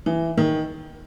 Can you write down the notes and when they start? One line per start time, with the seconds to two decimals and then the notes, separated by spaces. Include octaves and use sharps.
0.06 E3
0.38 D#3